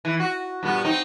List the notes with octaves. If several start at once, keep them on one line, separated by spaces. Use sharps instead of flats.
E3
F#4
G2 A#2 B3
C4 D#4